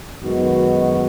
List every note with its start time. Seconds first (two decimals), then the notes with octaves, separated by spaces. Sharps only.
0.23 F#2 D#3 G#3 B3 F#4